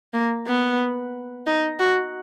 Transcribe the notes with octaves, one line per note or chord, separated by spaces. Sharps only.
A#3
B3
D#4
F#4